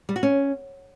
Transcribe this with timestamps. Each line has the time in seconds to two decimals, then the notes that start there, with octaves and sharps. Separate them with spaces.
0.09 G3
0.16 F#4
0.23 C#4